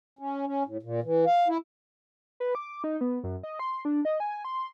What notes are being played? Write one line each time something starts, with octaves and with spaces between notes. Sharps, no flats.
C#4
C#4
A2
A#2
E3
F5
E4
B4
D6
D#4
B3
F#2
D#5
C6
D4
D#5
G#5
C6